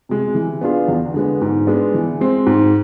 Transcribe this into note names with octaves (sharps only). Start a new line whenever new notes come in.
C3 G#3
E3
B3 D4 F4 G#4
E2
D3 G#3 B3
G#2
G#3 B3 D4
E3
G#3 C4
G#2